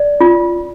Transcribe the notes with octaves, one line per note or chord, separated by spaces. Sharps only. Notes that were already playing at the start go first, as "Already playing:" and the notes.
Already playing: D5
F4